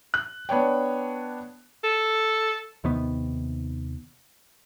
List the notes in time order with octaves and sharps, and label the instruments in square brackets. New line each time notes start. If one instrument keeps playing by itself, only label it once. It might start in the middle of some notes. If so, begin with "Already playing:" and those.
[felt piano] F#6
B3 D4 C#5 G5
[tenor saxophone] A4
[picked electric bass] D#2 C3 D#3 B3